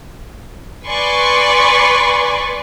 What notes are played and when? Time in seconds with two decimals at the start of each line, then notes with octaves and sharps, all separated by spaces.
0.86 B4 D5 G#5 C6 C#6